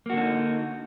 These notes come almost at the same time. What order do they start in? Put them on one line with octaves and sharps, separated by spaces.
A#3 F#4 D3 D4 D#4